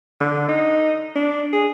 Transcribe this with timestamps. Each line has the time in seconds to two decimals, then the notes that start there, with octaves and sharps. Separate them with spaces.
0.21 D3
0.48 D#4
1.16 D4
1.53 G#4